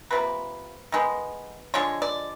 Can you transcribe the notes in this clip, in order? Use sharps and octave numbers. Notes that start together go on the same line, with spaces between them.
C3 F3 A#3 B4
D#3 G#3 B3
D3 F3 G#3 C#5
D5